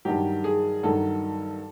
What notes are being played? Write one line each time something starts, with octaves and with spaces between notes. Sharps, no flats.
G2 D#3 F#3 G4
G#4
G2 D#3 F#3 A4